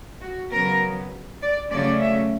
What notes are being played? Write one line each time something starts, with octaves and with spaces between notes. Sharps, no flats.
F#4
C#3 F#3 B3 A#4
D5
C#3 F#3 A3 C#4 D5
E5